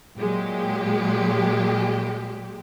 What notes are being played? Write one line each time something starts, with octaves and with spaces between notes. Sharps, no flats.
A#2 F#3 G#3 G4